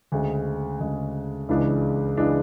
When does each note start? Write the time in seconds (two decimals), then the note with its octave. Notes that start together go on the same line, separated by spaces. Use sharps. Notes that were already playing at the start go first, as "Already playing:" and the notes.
0.12 D2 C#3 G#3
0.80 D2 C#3 G#3
1.49 C#2 C#3 E3 G#3 D4
2.17 C#3 E3 G#3 D4